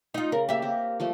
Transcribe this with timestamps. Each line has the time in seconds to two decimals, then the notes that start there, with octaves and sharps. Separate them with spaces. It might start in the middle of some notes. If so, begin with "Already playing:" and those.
0.14 D#4 F4
0.32 C#3 A#4
0.49 A#3 G4 E5
0.62 C4 A#4
1.00 F3 G3 A3